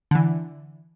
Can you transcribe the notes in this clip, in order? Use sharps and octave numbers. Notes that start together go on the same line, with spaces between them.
D3 E3